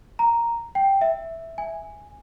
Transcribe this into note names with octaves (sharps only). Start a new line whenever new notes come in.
A#5
G5
E5
G#5